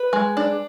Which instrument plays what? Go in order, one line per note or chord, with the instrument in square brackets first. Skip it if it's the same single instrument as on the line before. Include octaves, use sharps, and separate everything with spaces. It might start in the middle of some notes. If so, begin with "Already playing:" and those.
Already playing: [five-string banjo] B4
G#3
D4